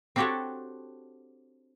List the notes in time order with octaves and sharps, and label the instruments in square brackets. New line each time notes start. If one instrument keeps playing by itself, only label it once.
[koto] C4 D4 F#4 G4 A4 C#5